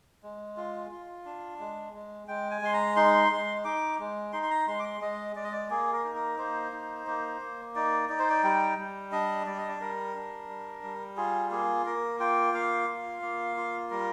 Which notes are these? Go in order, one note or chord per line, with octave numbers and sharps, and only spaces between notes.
G#3
F4
F4
D4
G#3
G#3
G#3 G5
G#5
G#3 C6
A#5
D#4 C6
G#3
D#4 D6
G#3
D#4 C6
C6
A#5
G#3 C6
D6
C6
G#3 D#5
G#3 D5
D#5
D5
A#3 G#4
A#4
D#4
A#4
A#3 C5
D#4
A#3
A#3
D#4 D5
D#4 D5
C5
D5
G3 G5
G3
D4 D#5
G3 D5
D#5
D5
G3 A#4
D4
G3
G3
F4 G#4
A#3 G#4
A#3 A#4
F4 G5
A#3 F5
F4
A#3
F4
G3 A#4